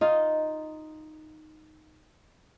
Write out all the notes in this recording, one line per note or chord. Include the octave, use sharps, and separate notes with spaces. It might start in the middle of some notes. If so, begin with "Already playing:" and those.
D#4 F4